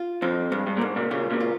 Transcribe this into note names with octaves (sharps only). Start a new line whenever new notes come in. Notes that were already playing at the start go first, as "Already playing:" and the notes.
Already playing: F4
F2 C4
G2 G#3
G2
A#2
G#2 G#3
A#2 C#3
A#2 C#3 F4
A#2 C#3
F4